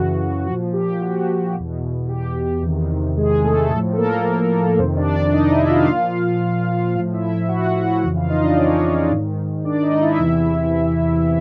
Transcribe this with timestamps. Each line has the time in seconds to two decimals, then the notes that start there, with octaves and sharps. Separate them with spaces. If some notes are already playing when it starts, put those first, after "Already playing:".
Already playing: F#2 C#3 E3 F#4
0.46 F3 F#4
0.52 A#2
0.73 G4
1.01 F#4
1.54 B2
1.59 E2
2.08 G4
2.62 E2 C3 D#3
3.17 G#3 G#4
3.44 A3 A4
3.70 A2 A3 A4
3.76 F3
3.93 A4
3.98 A#3 A#4
4.78 F2 C3 D#3 C4 C5
4.97 D4 D5
5.15 D4 D5
5.33 D#4 D#5
5.51 E4 E5
5.69 F4 F5
5.87 A#2 F3
6.95 A2 F3 F4 F5
7.13 E4 E5
7.49 F#4 F#5
7.76 F#4 F#5
8.03 F2 C#3 E3 F#4 F#5
8.17 F4 F5
8.30 D#4 D#5
8.43 D4 D5
8.58 C#4 C#5
9.12 G#2 D#3
9.65 D4 D5
9.83 D#4 D#5
10.01 E4 E5
10.20 E2 C3 E3